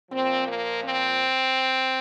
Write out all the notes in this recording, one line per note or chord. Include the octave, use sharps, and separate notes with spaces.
A#2 F3 C4
A#3
C4